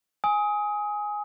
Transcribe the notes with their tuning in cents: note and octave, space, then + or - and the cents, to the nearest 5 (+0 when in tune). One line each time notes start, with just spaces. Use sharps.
G#5 +0 D#6 +25